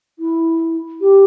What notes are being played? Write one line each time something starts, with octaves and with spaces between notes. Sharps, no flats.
E4
G4